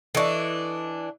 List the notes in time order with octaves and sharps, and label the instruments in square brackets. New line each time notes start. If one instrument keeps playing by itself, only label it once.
[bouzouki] E3 D4 [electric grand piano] A4 D#5 C#6